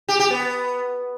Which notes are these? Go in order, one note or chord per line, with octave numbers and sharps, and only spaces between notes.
G4
G4
B3